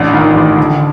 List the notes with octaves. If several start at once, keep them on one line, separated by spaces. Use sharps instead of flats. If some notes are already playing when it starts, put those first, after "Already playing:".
Already playing: A1 D4
D#3
A1
D3